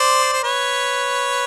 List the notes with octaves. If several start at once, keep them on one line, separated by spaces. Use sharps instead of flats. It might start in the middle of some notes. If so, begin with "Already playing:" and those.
Already playing: C5 D5
C5
B4 C#5